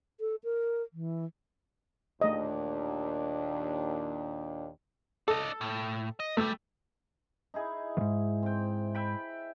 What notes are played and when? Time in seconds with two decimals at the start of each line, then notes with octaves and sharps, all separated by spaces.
0.20 A4
0.44 A#4
0.93 E3
2.21 D#2 A#2 A3 D4 D#5
5.28 D4 A4 D#5
5.61 A2
6.20 D#5
6.37 C#2 G3 A3
7.54 D#4 E4 G#4
7.97 E2 G#2
8.43 C4 G5
8.95 E5 G5 B5